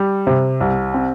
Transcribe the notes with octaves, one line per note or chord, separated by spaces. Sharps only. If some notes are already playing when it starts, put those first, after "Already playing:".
Already playing: G3
C3
C2
C4